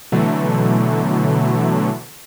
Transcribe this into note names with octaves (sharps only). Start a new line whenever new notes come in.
B2 D3 E3 F#3 A3